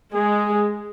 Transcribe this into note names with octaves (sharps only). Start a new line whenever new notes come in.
G#3 G#4